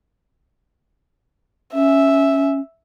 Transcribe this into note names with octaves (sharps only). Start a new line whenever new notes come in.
C#4 E5